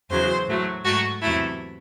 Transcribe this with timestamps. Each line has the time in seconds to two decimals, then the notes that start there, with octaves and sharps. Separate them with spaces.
0.11 E2 C#3 F#3 C5
0.48 A2 F#3 A3
0.84 G#2 F#3 A3 F#4
1.22 E2 C3 F#3 A3 E4